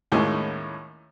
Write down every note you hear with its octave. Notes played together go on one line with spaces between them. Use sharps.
D#2 A2 G#3 A#3 C#4